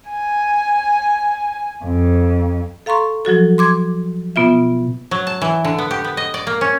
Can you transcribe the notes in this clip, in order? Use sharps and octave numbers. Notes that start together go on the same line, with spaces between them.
G#5
F2
A4 F5 A#5 C6 C#6
F3 F#3 F#4 A4
C6 D6 G#6
B2 B3 F4 E5
F#3
A5
E3
D3
B3
G4
B3
D#5
D5
A#3
C#4